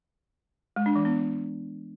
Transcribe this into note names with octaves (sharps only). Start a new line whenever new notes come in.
G#3
D4
E3
B3